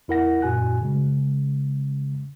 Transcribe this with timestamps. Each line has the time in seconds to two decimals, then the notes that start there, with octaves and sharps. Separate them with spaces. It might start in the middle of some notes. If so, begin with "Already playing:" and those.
0.08 E2 E4 A#4 F#5 A#6
0.42 F#2 A#2 F#4 G#5 F#6
0.82 C#3 G#3